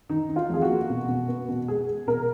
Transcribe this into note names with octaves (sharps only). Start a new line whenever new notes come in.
D#3 D#4
D#3
F4
F2 G#4
F#4
A#3
B2
B2
B3
B2
G#3 G#4
G#3
B2 A#4